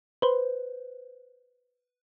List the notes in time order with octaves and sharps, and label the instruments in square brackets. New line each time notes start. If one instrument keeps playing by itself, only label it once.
[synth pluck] B4 C5